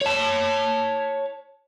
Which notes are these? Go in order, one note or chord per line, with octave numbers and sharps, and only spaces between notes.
C#5 A5